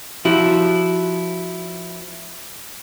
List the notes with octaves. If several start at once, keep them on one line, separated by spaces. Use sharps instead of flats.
F3 E4 F#4 G4